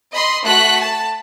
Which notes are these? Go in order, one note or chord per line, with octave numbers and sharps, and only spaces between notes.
D#5 B5 C6
A3 F#4 F#6 B6
A5